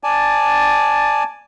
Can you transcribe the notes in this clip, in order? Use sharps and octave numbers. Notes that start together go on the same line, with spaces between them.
D5 G#5 A5